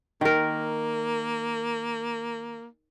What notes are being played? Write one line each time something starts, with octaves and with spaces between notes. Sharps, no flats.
D#3 A#3 A#4